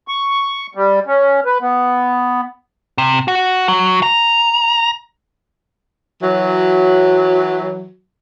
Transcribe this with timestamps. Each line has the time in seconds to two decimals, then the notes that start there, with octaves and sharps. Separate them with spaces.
0.08 C#6
0.75 G3
1.07 C#4
1.46 B4
1.61 B3
2.98 C3
3.28 F#4
3.68 F#3
4.03 A#5
6.22 E3 F#3